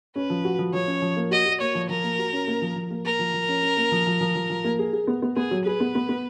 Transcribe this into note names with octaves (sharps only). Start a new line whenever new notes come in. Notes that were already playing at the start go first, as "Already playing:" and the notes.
C#4 B4
F3
F#4
F3
F3 C#5
C#4
F3
A#3
F#4 D#5
F#4
A#3 C#5
F3
F3 A#4
A#3
F#4
C#4
A#3
F3
F3
A#3
A#3 A#4
F3
F3
C#4
C#4
A#3
F3
F3
F3
F3
F3
A#3
G#4
G#4
B3
B3
B3 G#4
F#3
G#4 B4
B3
B3
B3